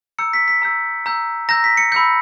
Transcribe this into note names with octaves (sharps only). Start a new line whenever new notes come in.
A#5 E6 G6 C#7
B6
B6
A#5 E6 G6
A#5 E6 G6
A#5 E6 G6 A#6
B6
C#7
B5 E6 G6 C#7